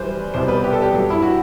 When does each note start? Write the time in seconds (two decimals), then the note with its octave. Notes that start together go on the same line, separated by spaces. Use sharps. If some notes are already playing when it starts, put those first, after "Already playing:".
Already playing: F#2 E3 G3 B4 C5
0.34 C2 B2 G3 C5
0.48 B4
0.63 G4
0.73 A4
0.82 G4
0.93 G2 F#3
1.10 E4
1.22 F#4